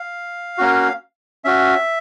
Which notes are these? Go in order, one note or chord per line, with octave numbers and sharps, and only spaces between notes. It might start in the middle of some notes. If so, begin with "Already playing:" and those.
Already playing: F5
A#3 C#4 F#4
C#4 F#4 E5